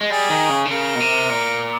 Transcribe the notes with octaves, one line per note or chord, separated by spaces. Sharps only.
G#3
G3 G#4
D#3
C#3
D3
C#3 A#4
B2
C3
A#2